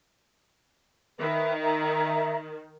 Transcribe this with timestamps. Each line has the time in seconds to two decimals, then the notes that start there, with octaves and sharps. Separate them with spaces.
1.19 D#3 B4 E5
1.62 E5 A#5